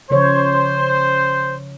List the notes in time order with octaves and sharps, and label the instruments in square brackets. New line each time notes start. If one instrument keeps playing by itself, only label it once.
[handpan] C#3 F3 C#5 [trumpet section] C5